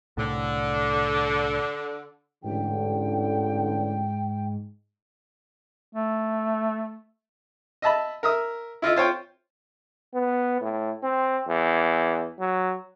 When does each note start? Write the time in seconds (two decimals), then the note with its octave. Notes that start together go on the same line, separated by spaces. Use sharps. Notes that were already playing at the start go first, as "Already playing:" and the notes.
0.17 C2 A2 D3
2.44 A1 G#2 D3 G5
5.93 A3
7.82 D#5 E5 A5 B5
8.23 A#4 E5 D#6
8.82 E4 F4 D#5 E5
8.96 F4 C5 C#5 G5
10.14 B3
10.61 A2
11.03 C4
11.48 E2
12.39 F#3